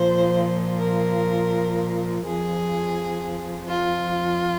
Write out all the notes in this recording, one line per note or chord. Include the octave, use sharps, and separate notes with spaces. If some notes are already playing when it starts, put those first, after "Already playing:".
Already playing: A#2 F3 C5
A#4
F2 F3 G#4
F4